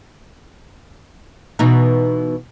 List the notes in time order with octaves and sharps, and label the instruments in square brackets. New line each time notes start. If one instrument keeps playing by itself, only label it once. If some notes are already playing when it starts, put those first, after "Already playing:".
[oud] B2 E3 D#4